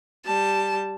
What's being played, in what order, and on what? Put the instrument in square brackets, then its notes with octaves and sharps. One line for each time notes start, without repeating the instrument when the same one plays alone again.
[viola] G3 [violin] A5